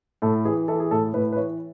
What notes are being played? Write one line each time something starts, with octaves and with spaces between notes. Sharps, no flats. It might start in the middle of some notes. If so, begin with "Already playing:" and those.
A2 A4
E3 G#4
E3 A4
G#4
A2 A4
A2 B4
B4
E3 C#5